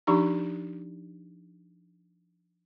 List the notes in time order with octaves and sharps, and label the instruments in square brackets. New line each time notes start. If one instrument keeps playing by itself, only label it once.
[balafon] F3 D4 D#4 G4 A#5